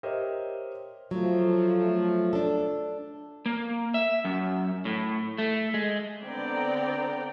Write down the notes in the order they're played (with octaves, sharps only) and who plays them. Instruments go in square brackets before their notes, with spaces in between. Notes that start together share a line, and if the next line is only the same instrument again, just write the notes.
[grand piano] G4 A#4 C5 C#5 D#5 E5
[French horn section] F3 A3 [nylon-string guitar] F#3
[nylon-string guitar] D4 A4
[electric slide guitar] A#3
E5
F#2
A2
A3
G#3
[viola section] D3 B3 C4 D5 G5 A#5